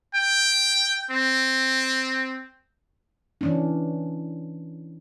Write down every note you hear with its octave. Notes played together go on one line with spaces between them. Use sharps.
G5
C4
E3 C#4 D4